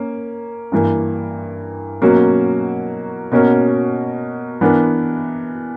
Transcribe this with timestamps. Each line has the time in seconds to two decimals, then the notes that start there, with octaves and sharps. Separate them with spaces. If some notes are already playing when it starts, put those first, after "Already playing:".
Already playing: A#3 C#4
0.72 G2 E3 A#3
2.02 B2 F#3 A#3 C#4 F#4
3.32 B2 A#3 C#4 F#4 A#4
4.61 E3 B3 D4 A#4